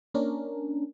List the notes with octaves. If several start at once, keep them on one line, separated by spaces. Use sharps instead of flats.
A#3 C#4 D4 A#4